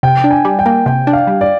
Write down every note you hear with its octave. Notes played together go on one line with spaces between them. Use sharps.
C3 G5
D4
G#5
G3
G5
A#3
C3 G5
D4
F5
G3
D5